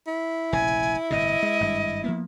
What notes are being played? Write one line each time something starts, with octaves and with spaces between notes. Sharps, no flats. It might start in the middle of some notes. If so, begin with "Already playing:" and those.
E4
F1 A#1 C#3 G#5
G1 A2 C3 D#5
G#3
G#1 G2 G#3
F3 A#3 B3